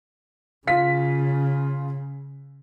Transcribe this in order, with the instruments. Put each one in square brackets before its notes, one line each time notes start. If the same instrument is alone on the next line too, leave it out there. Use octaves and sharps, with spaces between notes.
[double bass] C#3 [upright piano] F4 B6